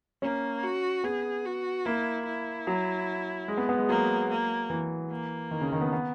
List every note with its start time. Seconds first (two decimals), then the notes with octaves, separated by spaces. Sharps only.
0.22 A#3 C#4
0.63 F#4
1.04 B3 G#4
1.45 F#4
1.85 A#3 E4
2.25 E4
2.67 F#3
3.48 G#3
3.58 B3
3.69 B3
3.79 G#3
3.89 F#3 A#3
4.30 A#3
4.70 E3
5.11 A#3
5.51 D#3
5.61 C#3
5.72 D#3
5.82 B3
5.93 B3